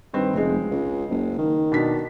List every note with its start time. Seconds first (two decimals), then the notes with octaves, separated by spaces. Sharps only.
0.13 G2 D#3 C4 B4
0.34 F1 C#3 G#3
0.71 C#2
1.10 F#1
1.38 D#3
1.72 B2 D4 B6